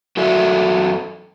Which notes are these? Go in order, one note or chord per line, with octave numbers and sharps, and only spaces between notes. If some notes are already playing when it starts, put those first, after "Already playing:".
F#2 F#4 A4 E5